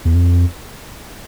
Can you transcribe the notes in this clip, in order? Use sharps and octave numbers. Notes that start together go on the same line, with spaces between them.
E2
F2